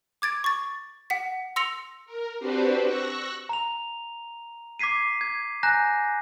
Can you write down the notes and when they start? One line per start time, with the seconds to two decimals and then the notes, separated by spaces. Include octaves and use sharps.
0.22 D6 G#6 A6 D7
0.44 C#6 A6
1.10 F#5 B6
1.56 C6 E6 A#6 C#7 F7
2.06 A#4
2.39 C4 D4 F#4 G4 B4 C5
2.83 C#6 E6 F#6 A#6
3.49 A#5 F7
4.79 D6 G#6 B6 C7 D#7
5.21 G#6
5.63 G#5 A#5 F#6 G6 A#6